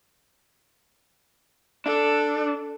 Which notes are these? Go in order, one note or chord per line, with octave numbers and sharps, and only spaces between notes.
D4 A4